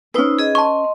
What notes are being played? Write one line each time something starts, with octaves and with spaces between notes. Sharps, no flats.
C#4 D#4 B4 C5 E6
G#4 D#5
D#5 A5 C6 C#6